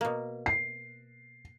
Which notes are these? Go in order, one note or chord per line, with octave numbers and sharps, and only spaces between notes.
B2 A#3
C7